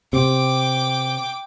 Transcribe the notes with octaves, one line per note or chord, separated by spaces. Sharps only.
C3 G5 D6